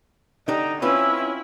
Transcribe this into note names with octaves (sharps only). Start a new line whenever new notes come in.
D3 D4 D#4 G4
C4 C#4 E4 F4 B4 E6